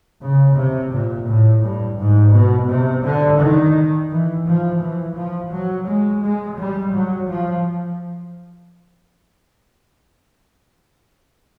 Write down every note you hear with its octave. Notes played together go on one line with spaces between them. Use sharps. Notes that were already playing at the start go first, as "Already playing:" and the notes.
C#3
C3
A#2
A2
G2
G#2
B2
C3
D3
D#3
E3
F3
E3
F3
F#3
G#3
G#3
G3
F#3
F3